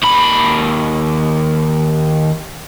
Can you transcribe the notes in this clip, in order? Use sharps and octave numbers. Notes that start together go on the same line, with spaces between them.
D#2 B5